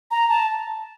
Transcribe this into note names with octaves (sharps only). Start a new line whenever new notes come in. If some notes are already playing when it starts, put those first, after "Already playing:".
A#5
A5